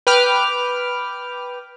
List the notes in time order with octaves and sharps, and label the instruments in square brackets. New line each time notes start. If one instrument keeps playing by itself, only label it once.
[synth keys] B4 G5 D6 F6